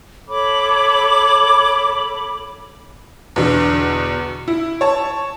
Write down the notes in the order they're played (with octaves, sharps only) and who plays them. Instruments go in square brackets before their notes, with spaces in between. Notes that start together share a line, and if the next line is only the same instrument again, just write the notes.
[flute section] A4 C#5 B5 D6
[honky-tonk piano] E2 B2 D3
E4
C#5 A5